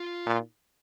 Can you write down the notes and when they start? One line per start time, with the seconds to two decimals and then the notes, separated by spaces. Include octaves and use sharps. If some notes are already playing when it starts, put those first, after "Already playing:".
Already playing: F4
0.26 A#2